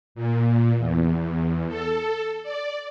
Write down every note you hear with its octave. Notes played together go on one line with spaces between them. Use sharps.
A#2
E2
A4
D5